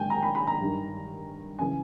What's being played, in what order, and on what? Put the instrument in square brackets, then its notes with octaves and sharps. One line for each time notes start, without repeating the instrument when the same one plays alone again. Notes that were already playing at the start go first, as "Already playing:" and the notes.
Already playing: [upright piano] G#2 D#3 G5 G#5
A#5
B5
B5
A#5
G2 D#3
C#3 E3 G#5